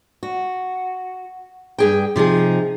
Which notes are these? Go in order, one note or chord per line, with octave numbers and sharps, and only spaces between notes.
F#4
G2 G#4 G5
C3 F3 D#4 G#4